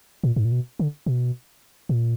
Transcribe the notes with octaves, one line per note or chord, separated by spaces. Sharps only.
A#2
G#2
A#2
B2
D3
B2
A#2